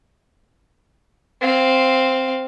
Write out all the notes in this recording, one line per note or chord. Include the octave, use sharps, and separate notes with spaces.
C4 F5